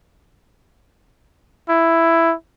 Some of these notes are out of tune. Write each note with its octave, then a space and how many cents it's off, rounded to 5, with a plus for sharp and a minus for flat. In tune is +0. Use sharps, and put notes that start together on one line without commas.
E4 +5